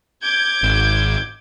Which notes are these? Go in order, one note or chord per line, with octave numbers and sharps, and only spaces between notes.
D6 G6 G#6
G#1